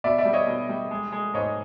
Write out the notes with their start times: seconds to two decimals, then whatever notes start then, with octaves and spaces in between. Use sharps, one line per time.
0.04 B2 D5 E5
0.18 D5 E5
0.25 G3
0.33 C#5 D#5
0.47 B2
0.69 G3
0.91 G#3
1.12 G#3
1.34 G#2 C#5 D#5